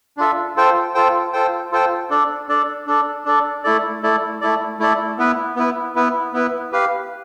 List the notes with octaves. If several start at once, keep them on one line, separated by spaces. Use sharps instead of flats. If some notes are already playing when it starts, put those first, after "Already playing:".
D4 F4 A4 E5
F4 A4 C5 G5
F4 A4 C5 G5
F4 A4 C5 G5
F4 A4 C5 G5
D4 A4 D5
D4 A4 D5
D4 A4 D5
D4 A4 D5
A3 E4 A4 D5
A3 E4 A4 D5
A3 E4 A4 D5
A3 E4 A4 D5
B3 E4 B4
B3 E4 B4
B3 E4 B4
B3 E4 B4
G4 B4 F5